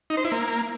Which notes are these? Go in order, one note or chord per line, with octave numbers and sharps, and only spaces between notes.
D#4
C5
E4
A#3